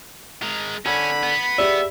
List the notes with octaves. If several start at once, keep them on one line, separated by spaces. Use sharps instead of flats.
G#3 A#4
D3 C#4 B5 G#6
B3
G4 G#4 D5 E5